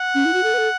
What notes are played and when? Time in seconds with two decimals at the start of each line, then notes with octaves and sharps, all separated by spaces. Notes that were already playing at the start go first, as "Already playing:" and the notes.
Already playing: F#5
0.14 C#4
0.25 E4
0.33 F#4
0.43 A4
0.54 B4
0.58 A4